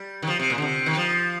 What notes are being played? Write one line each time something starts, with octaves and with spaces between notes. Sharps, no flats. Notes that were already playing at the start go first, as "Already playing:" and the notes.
Already playing: G3
D#3
F3
C3
A#2
D3
C3
D#3
F3